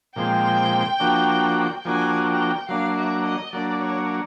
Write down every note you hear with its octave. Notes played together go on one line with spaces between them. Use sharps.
A#2 F3 G#3 C4 G5
F3 A#3 D4 F#4
F3 A#3 D4 F#4 G#5
G5
F#3 A#3 D4 F5
E5
D#5
F#3 A#3 D4 D5
C#5